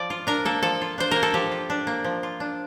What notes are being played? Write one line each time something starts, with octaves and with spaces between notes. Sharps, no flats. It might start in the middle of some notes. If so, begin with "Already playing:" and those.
Already playing: F3 D5
F4
D4 A#4
A#3 A4
F3 A4
F4
D4 C5
A#3 A#4
A4
F3 G4
F4
D4
A#3
F3
F4
D4